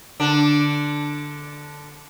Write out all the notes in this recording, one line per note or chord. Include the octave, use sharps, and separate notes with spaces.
D3 D4